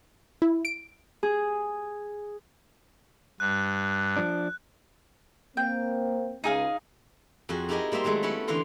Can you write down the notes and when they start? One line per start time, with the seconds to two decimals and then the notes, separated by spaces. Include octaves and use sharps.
0.42 E4
0.65 D7
1.23 G#4
3.40 G2 F#6
4.16 F3 D4
5.57 A#3 C4 G5
6.44 C#2 D#4 G#4 F5
7.49 F2 F#4 G#4
7.69 D#4 E4 G4 G#4 A#4 D#5
7.92 G3 A#3 C5 E5 C6
8.04 D#3 F#3 G#3 A3
8.23 B3 C#4 E4 A4 F#5
8.48 D3 E3 F5 A#5 C6